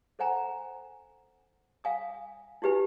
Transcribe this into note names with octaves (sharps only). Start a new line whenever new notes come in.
A4 C5 F#5 G#5 A#5
F5 G#5 D#6
E4 F#4 G4 B4 G#5